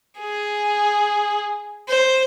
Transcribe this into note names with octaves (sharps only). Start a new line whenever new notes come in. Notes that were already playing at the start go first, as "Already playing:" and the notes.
G#4
C5